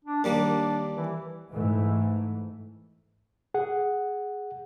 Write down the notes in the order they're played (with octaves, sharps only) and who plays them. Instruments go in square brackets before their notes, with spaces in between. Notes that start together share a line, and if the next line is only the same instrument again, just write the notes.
[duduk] D4
[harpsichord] D#2 G3 A#3 [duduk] D4
[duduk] E3
[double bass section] G#2 E3 A3
[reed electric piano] G#4 F#5